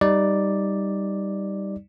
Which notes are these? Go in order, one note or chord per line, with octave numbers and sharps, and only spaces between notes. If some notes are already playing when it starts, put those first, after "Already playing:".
G3 D#4 D5